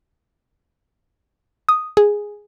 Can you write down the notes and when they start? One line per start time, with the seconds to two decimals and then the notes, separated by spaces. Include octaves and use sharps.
1.69 D#6
1.97 G#4